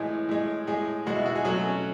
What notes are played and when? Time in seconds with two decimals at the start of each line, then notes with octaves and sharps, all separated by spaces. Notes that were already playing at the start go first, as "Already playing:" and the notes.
Already playing: A2 E3 G#3
0.29 A2 G#3
0.67 A2 G#3 G#4
1.06 B2 G#3 F#4
1.16 E4
1.26 F#4
1.35 G#4
1.45 B2 F#3 A3 F#4
1.64 C#4